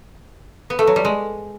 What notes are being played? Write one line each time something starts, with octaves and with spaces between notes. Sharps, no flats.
B3
A3
F#3
G3
G#3